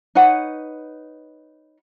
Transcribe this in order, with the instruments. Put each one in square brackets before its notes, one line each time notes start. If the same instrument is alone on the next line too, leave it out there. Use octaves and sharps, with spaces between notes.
[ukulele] D#4 B4 C#5 F#5